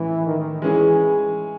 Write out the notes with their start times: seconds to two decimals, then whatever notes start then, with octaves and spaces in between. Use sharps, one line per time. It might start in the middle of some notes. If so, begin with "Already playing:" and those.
Already playing: A2 E3 G#3 C#4
0.26 D#3
0.62 E3 G#3 C#4 G#4